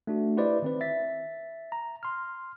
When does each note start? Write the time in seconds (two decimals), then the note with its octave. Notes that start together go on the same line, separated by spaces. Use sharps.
0.07 A3 D4 F#4
0.37 E4 G4 B4 C5 D5 D#5
0.62 D#3 C4 B4
0.81 E5 A6 B6
1.72 A#5
2.03 C6 F6